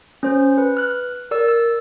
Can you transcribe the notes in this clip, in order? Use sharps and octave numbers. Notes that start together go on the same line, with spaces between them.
C#4 C5
B4
F6 F#6
A#4 D5 E6
E6